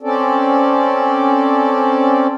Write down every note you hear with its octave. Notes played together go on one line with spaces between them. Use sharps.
C4 C#4 A4 D5